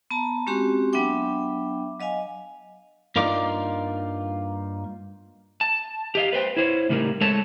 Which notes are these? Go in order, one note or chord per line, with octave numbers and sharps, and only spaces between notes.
B3 A5 A#5
G#3 C4 C#4 F#4 G4 C6
F#3 B3 D4 E5 G5 D6
F#3 D#5 F5 G#5
G2 A#3 D#4 F4 D5
A5
G4 D#5 F5
B4 C5 G5
E4 C5 C#5
A2 C#3 G3 D#4 A#4
G#3 A4 C#5 A5